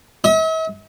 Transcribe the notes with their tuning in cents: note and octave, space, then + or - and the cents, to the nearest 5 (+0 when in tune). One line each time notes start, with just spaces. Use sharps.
E5 -45 D#6 +40